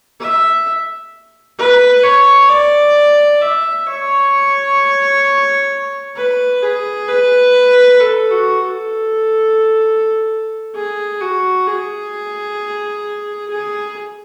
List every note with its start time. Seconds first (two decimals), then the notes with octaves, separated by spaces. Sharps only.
0.20 E5
1.58 B4
2.04 C#5
2.49 D5
3.41 E5
3.87 C#5
6.16 B4
6.62 G#4
7.09 B4
8.00 A4
8.31 F#4
8.61 A4
10.75 G#4
11.21 F#4
11.67 G#4
13.50 G#4